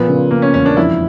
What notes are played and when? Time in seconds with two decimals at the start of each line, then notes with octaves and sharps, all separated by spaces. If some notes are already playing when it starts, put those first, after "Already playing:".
Already playing: A#2 F3 B3
0.08 C#3
0.31 C#3 A#3
0.42 C#4
0.54 E1 C#4
0.66 D4
0.77 F2 E4